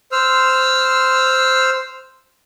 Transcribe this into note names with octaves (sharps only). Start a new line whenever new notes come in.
C5 E6 F6